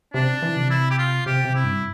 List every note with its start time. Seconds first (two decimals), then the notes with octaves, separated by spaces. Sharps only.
0.14 C3 D4
0.42 E3
0.57 C3
0.70 E4
0.90 G4
0.98 F4
1.26 C3 G4
1.45 C3
1.55 E4
1.64 G2